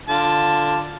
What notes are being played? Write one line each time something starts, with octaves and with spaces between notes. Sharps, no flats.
D3 F4 A5